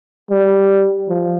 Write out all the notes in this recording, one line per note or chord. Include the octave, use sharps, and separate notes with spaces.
G3
F3